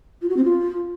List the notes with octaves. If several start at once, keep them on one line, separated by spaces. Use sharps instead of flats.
F4
F#4
C4
F4